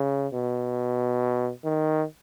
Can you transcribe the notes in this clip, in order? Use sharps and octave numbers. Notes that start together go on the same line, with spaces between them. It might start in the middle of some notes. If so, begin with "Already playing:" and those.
Already playing: C#3
B2
D#3